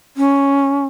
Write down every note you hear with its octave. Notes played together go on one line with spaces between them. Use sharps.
C#4